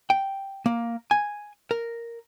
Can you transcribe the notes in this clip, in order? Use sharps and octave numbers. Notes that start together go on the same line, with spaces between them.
G5
A#3
G#5
A#4